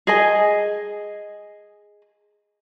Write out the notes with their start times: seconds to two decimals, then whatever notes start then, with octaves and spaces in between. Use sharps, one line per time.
0.07 G#4 D#5 G#5